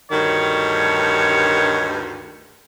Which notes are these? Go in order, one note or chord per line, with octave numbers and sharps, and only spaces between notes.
D2 G2 D#3 C#5